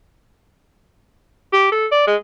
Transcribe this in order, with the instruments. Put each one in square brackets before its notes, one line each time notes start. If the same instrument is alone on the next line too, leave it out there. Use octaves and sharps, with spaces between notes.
[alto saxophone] G4
A4
D5
G#3